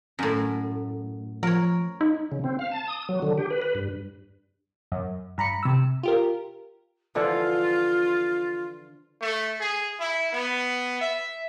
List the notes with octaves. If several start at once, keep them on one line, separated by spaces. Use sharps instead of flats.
F#2 A2
F3 A#4 C#5
D#4
C#3
C4
F5
A5
D#6
F#3
D3
G4
B4
B4
G2
F#2
G2 A#5 B5 C#7
C3 E6
F4 G4 A#4
D3 E3 F3 F4
A3
G#4
E4
B3
E5